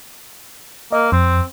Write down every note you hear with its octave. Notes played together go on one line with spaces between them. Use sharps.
A#3 D#5
F2 C4